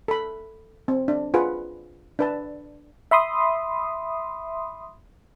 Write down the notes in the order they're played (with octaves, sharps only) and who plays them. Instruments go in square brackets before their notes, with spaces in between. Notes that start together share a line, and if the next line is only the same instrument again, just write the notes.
[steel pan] A4 B5
C4
D4
F4 G#4 B4 F#5
D4 B4 A5
[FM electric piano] E5 B5 C6 D#6